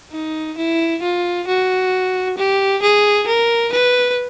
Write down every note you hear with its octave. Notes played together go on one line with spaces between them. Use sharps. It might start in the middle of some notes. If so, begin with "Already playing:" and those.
D#4
E4
F4
F#4
G4
G#4
A#4
B4